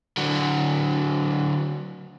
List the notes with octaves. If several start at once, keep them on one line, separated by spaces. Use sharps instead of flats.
D3 F#3